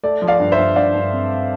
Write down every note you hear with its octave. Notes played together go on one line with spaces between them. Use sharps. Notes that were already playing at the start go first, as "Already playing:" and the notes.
A3 D5
F3
D5 F5
G2
C5 E5
G2
G2 D5 F5
G2
C4